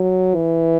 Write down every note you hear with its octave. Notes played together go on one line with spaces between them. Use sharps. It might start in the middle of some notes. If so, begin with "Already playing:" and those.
Already playing: F#3
E3